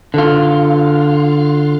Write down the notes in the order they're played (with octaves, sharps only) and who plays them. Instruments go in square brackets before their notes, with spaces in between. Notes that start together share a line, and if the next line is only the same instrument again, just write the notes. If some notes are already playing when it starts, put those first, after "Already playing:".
[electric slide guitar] D3 F4